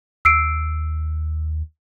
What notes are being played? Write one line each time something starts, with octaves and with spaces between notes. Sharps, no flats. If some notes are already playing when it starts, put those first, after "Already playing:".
D#2 E6 C7 D7